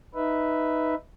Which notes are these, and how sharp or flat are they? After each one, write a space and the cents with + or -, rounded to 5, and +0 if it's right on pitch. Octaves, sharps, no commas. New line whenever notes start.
D#4 +0 B4 +0 E5 +0